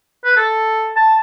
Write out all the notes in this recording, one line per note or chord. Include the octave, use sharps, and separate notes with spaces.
B4
A4
A5